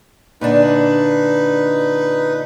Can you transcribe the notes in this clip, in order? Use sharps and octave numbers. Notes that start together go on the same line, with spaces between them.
A#2 D3 D4 D#4 B4